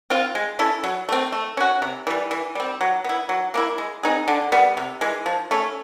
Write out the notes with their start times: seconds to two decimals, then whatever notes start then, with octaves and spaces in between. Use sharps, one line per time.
0.10 C4 F4
0.35 G#3
0.59 C#4 E4 A4
0.84 F#3
1.09 A3 C4
1.32 A3
1.57 C#4 F#4
1.82 C3
2.07 E3 G3
2.31 E3
2.55 G3 C4
2.81 F#3
3.04 B3 E4
3.29 F#3
3.54 A#3 C#4 E4
3.78 G#3
4.03 C4 D#4 G#4
4.28 D3
4.52 G3 B3
4.77 C3
5.01 E3 G#3
5.26 F3
5.51 A3 C#4